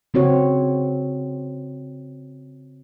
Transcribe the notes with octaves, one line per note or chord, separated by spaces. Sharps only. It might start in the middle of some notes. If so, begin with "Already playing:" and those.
C#3 C4 F#4 C#5